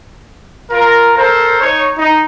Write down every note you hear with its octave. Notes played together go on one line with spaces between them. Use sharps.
F4 A#4
A4 A#4 C5
D#4 C#5
D#4